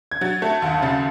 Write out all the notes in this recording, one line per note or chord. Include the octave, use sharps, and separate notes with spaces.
G#6
F#3 A6
A3
D#2
C#3 A6